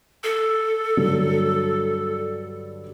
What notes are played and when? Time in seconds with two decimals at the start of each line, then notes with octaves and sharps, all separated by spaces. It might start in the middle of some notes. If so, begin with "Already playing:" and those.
0.24 A4
0.97 G2 D3 F#3